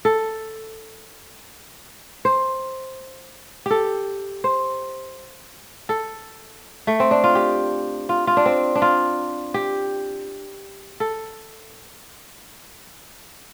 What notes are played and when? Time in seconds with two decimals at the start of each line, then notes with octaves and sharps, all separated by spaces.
0.05 A4
2.25 C5
3.66 G4 A4
4.44 C5
5.89 A4
6.87 A3
7.00 C4
7.11 D4
7.24 F4
7.35 G4
8.09 F4
8.27 F4
8.37 D4
8.46 C4
8.75 D4
8.82 F4
9.54 G4
11.00 A4